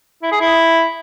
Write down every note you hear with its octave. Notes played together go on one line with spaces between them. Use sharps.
E4
G#4
E4